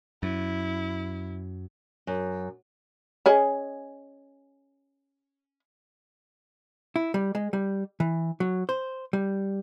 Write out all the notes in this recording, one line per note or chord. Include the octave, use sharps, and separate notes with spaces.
F#2 E4
F#2
C#4 G#4 D#5
E4
G3
G#3
G3
E3
F#3
C5
G3